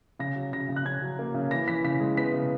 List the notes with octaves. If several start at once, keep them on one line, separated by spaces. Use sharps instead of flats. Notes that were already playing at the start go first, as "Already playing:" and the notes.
C#3 A#6
F#3
C#3 A#6
C#3
F#6
C#3 G#6
F#3
A#3
C#3
E3 A#6
E3 B6
C#3 B6
G#3
B3 B6
C#3